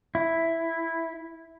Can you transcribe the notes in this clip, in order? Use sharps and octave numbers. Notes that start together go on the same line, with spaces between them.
E4